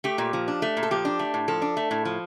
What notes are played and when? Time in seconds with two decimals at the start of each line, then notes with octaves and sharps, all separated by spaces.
0.04 A3 G4
0.18 A#2
0.33 F3
0.48 D4
0.62 A3
0.77 A#2
0.83 A4
0.91 F3 G4
1.05 D4
1.19 A3
1.34 A2
1.48 F3 A4
1.62 D4
1.77 A3
1.91 A2
2.05 F3